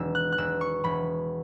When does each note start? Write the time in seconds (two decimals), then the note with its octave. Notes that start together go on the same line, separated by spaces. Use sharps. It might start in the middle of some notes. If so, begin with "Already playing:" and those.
Already playing: E1 D#3 E6
0.15 F#6
0.32 F#6
0.38 E1 E6
0.61 C#6
0.84 E1 B5